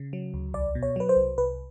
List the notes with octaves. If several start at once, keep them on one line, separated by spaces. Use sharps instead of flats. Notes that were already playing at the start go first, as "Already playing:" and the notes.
Already playing: C#3
F#3
D2
C2 D5
B2
C#5
F#3 B4
C5
C2
C2 B4